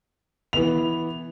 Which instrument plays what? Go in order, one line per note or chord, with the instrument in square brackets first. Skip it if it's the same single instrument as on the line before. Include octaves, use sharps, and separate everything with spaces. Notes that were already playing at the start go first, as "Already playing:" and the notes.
[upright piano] E3 B3 F7